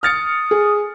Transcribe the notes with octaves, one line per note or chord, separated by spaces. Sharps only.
D#6 F6 A6 C#7
G#4